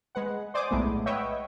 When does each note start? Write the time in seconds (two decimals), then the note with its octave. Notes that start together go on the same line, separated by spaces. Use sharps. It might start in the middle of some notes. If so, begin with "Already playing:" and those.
0.15 G#3 B4 F#5
0.54 C5 D5 G#5 D6 D#6
0.71 B1 A2 G#3 A3 B3
1.06 B4 C#5 D#5 E5 F#5 G5